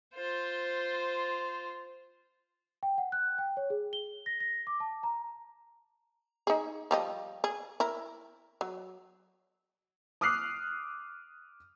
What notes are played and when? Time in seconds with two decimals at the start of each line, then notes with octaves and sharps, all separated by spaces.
0.15 F4 C5
2.83 G5
2.98 F#5
3.12 F#6
3.38 G5
3.57 C#5
3.70 G#4
3.93 G7
4.26 A#6
4.40 A#6
4.67 D6
4.80 A5
5.03 A#5
6.47 D#4 G#4
6.91 F3 G3 D#5
7.44 G#4
7.80 E4 A#4
8.61 F#3
10.21 D6 D#6 F6 F#6 C7